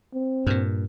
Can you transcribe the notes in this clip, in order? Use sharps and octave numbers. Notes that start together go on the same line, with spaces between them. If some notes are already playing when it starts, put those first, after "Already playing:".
C4
G2 A#2